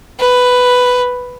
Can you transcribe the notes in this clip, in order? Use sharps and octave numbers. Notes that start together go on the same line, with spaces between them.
B4